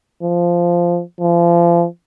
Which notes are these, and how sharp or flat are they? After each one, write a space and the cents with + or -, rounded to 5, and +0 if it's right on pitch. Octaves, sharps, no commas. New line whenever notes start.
F3 -10
F3 -30